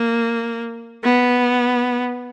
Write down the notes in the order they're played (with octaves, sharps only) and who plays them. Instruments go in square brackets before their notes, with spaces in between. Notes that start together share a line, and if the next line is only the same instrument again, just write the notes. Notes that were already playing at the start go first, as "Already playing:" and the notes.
Already playing: [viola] A#3
B3